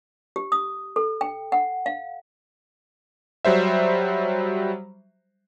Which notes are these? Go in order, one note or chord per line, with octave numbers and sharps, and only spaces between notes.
G4
D#6
A4
G5
F#5
F5
F#3 G3 C5 E5